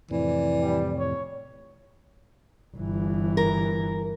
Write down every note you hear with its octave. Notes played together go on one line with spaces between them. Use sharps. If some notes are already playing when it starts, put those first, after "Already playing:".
F2 A2 C3 E3 D5
G3
C#5
G1 E3
A#4